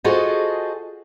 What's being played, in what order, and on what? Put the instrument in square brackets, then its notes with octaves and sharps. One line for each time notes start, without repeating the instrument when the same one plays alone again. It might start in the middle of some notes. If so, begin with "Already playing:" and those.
[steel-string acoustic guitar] F4 F#4 G#4 A4 C5 D#5